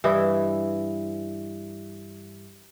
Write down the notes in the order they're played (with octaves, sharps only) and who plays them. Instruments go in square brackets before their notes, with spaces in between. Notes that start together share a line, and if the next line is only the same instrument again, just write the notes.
[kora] G2 E3 E4 D#5